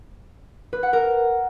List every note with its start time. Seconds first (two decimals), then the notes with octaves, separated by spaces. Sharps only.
0.73 B4
0.83 F#5
0.93 A#4